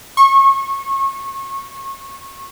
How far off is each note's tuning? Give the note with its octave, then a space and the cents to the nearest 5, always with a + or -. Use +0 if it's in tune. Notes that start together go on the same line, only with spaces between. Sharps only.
C#6 -30